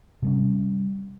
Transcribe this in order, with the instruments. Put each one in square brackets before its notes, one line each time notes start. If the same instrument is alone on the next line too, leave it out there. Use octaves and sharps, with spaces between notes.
[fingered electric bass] C3 G3 C#4